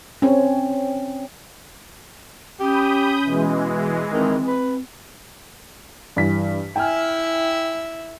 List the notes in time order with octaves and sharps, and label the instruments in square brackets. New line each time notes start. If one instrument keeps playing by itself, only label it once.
[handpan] C4 C#4
[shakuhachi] C#4 [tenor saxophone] G4 [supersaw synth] B5 D#6 G6
[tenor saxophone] B2 [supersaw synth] E3 G#3
[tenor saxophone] D#3 [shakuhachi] C4
[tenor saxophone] B4
[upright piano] G2 E3 B6
[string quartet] E4 E5 [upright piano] G5 G#5 F6